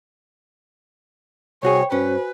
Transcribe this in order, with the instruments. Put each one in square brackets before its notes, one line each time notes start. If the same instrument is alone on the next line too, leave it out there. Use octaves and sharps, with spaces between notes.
[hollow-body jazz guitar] C2 F#4 G#4 [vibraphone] C5 G5 [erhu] C#5
[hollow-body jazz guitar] G2 C#4 [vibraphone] F#4 C5 G#5 [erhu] B4